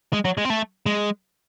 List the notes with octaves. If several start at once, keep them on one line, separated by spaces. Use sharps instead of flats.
G#3
F#3
G#3
C4
A3
G#3